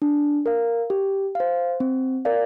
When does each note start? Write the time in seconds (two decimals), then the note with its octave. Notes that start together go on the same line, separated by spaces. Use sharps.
0.02 D4
0.46 A#4 F5
0.90 G4
1.35 C5 F5
1.80 C4
2.25 A#4 D5 F5